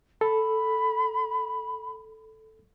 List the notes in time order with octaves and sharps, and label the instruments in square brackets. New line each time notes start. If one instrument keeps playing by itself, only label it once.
[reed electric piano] A4 [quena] B5